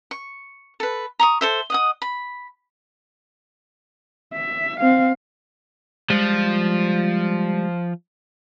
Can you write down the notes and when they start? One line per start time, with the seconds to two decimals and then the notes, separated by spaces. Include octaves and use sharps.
0.11 C#6
0.80 A4 B4
1.19 A#5 C#6 D#6
1.41 A4 C5 E5
1.70 D#5 F#5 D#6
2.02 B5
4.34 E5
4.80 C4 F5
6.10 F3 G3 G#3